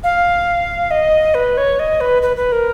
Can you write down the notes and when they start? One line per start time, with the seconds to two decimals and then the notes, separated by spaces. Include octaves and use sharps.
0.03 F5
0.91 D#5
1.34 B4
1.57 C#5
1.79 D#5
2.00 B4
2.22 B4
2.36 B4
2.52 A#4